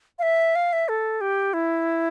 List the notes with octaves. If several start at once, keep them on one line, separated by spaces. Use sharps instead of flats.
F5
E5
F5
E5
A4
G4
E4